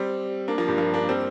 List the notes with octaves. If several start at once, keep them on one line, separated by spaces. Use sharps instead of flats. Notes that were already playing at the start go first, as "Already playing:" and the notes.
Already playing: G3 C4
A#3 D4
F3 A#3
G2
F3 A#3
A#3 D4
G3 C4